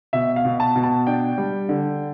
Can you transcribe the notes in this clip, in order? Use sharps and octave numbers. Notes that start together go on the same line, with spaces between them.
B2 E5
F5
B2
A5
B2
A5
D4 G5
G3
D3